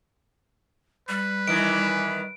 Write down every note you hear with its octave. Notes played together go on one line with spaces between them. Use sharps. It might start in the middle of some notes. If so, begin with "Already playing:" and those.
G3 B4
D#3 E3 D7